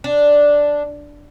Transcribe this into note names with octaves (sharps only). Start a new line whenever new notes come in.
D4